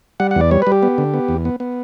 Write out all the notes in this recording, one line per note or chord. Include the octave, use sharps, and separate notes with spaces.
G3 F#5
F#5
E2
D5
G3 C#5
B4
G3
G4
B3
D3
B3
E2
B3
B3